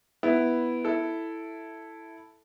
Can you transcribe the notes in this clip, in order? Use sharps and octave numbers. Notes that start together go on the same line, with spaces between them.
B3 E4
E4 A4